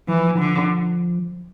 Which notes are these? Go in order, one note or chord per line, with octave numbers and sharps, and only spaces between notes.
E3 F3
D3